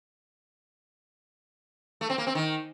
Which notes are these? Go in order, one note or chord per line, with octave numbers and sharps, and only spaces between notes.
A3
C4
A#3
C4
D#3